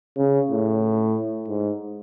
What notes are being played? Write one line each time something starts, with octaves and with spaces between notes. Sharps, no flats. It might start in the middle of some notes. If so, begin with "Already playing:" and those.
C#3
A2
G#2